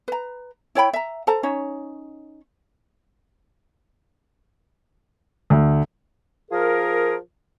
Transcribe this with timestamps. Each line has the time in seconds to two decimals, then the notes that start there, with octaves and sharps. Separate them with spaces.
0.08 B4 A#5
0.75 E4 C#5 G5 B5
0.93 E5 A#5
1.27 A4 C5 A5 A#5
1.43 C#4 D#4 C#5
5.50 D2
6.51 F3 F4 G#4 A#4